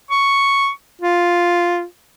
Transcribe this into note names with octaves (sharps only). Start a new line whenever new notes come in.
C#6
F4